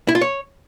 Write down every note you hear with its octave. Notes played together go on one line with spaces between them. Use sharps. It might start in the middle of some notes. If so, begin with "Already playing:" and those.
E4
F4
C#5